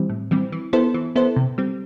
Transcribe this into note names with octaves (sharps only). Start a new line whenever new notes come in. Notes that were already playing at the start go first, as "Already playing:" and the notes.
Already playing: E3 G3 C4
A2
E3 G3 C4
E3
B3 E4 A4 C5
E3
B3 E4 A4 C5
C3
G3 C4